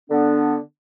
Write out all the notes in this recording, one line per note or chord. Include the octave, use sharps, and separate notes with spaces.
D3 B3 D4